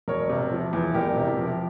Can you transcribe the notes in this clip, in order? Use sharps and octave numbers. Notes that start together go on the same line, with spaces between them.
E1 A#4 C#5
C3
F3
E2
E1 G4 A#4
C3
F3